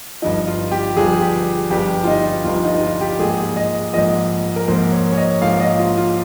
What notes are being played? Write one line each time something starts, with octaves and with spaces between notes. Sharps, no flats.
G1 G2 F3 D#4
F4
G4
G1 G2 F3 G#4
G4
G1 G2 F3 G4
F4
D#4
G1 G2 F3 F4
D#4
D#4
F4
G4
A#1 G#2 F3 A#3 G#4
D#5
A#1 G#2 F3 A#3 D#5
A#4
A#1 G#2 F3 A#3 C5
C#5
C#5
D#5
A#1 G#2 F3 A#3 F5
D#5
F4
F4